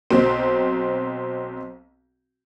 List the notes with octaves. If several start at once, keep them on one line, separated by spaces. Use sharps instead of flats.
B1 F#3 C4